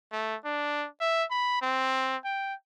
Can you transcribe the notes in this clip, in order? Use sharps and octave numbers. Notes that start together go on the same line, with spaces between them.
A3
D4
E5
B5
C4
G5